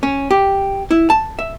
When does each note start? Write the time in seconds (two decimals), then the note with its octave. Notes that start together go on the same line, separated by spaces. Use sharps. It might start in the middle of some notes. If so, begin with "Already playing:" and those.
0.03 C#4
0.31 G4
0.91 E4
1.10 A5
1.39 E5